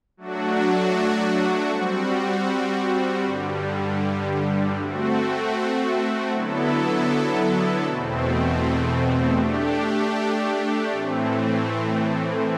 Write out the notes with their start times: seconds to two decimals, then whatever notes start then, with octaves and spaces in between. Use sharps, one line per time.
0.17 F#3 A3 D4 F#4
1.70 G3 C4 F#4
3.24 G2 D3 G3
4.76 A3 C4 F#4
6.31 D3 F#3 B3 E4 A4
7.84 E2 B2 A3 C4
9.37 A3 D4 G4
10.91 A2 E3 A3 C4